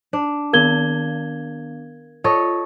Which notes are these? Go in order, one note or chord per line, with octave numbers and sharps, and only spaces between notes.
D4
D#3 B3 A#4 F5 G#6 G7
F4 A4 C#5 D#5